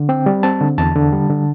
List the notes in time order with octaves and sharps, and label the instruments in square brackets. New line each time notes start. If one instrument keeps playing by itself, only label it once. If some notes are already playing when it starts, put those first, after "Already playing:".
Already playing: [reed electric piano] D3
C4 G5
G3
C4 A5
D3
E2 A5
D3
G3
D3